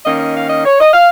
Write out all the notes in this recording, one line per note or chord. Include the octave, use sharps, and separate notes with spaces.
D#3 A#3 C#4 D#5
D#5
F5
D#5
C#5
D#5
F5